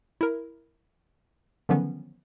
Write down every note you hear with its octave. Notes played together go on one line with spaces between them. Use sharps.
E4 A#4
D3 D#3 F3 F#3 B3 C#4